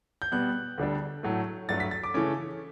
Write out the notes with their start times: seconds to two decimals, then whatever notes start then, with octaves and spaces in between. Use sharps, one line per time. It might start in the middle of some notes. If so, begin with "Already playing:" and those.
0.22 G6
0.32 B2 G3 B3 F#6
0.78 D2 D3 G3 D4
1.23 A2 F#3 A3
1.69 G2 F#3 A3 D4 A6
1.80 B6
1.91 A6
2.04 D6
2.14 C#3 E3 A3 C#4 D6